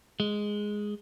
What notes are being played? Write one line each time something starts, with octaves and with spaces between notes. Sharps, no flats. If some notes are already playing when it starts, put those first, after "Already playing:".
G#3